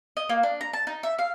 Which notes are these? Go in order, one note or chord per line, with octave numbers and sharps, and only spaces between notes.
D#5
A#3
D4
A#5
A5
D#4
E5
F5